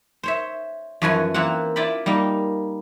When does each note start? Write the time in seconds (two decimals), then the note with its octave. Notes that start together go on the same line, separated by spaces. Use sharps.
0.23 C5 C#5 E5
1.02 F#2 E3 F3 B4 C#5 G#5
1.34 E3 A#3 C4 F#5
1.76 E4 F4 D5 G5 B5
2.06 G3 A#3 D#4